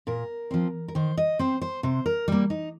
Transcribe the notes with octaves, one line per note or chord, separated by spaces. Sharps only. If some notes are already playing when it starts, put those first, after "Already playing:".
A#2 A#4
F3 C4
A#4
D#3 C5
D#5
C4 C5
C5
C3 C5
A#4
G3 A#3
D#4